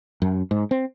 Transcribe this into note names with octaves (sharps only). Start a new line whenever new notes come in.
F#2
G#2
C4